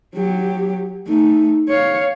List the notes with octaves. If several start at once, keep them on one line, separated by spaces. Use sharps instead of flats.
F#3 G4
A3 D#4
C#5 F5